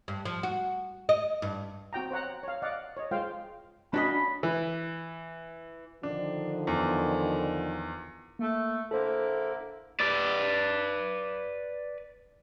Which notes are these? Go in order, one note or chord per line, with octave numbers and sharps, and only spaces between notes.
G2
F3
F#4
D#5
G2
C4 F#4 G5 A#5
C5 C#5 F#5 A#5
C#5 F5
D5 D#5 F5 F#5
C#5 D#5
G#3 F4 C5 F5 G5
A#2 C#4 D4 F#4 D#5 B5
E3
D3 D#3 F3 D4
E2
A3 A#3
D3 A#3 E4 A4 C5
B4 D5